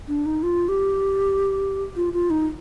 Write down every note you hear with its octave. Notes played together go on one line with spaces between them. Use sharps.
D4
D#4
F4
G4
F4
F4
D#4